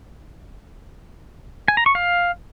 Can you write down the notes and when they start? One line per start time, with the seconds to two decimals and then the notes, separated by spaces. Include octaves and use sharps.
1.68 G#5
1.77 A#5
1.86 C#6
1.95 F5